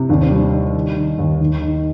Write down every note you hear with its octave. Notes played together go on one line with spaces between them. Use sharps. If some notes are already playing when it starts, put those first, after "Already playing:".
Already playing: C3
D#2 D4
C4
G3 D4
D#3
D#3
D#3
D#2
D#2
D#3